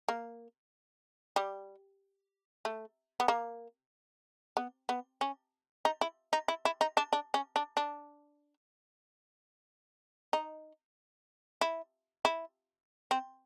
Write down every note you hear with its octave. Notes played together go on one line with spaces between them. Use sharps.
A#3
G3
A3
B3
A#3
B3
B3
C#4
D#4
E4
D#4
E4
E4
D#4
D4
D4
C#4
D4
D4
D#4
E4
E4
C4